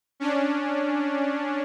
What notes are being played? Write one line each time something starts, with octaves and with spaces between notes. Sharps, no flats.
C#4 D4